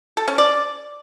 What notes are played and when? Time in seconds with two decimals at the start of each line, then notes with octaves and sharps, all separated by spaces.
0.17 A4
0.28 C#4
0.38 D5